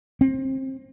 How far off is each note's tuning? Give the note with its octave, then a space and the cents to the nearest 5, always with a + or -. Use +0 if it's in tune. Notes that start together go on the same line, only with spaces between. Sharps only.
C4 +25